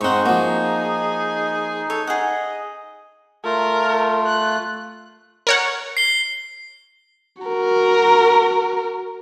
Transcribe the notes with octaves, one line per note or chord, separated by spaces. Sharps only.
G#2 C4 D#4 G#4 F#5 C#6
F3 A#3 F#4
A4 C#5
G#4 D#5 F#5
A3 F4 A#4
F#6
A#4 C#5 F#5
C7 G7
F#4 A#4